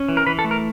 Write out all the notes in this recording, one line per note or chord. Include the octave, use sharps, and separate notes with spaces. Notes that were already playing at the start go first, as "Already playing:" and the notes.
Already playing: C#4
E3
A#4
E3 B4
A4
A3
A#4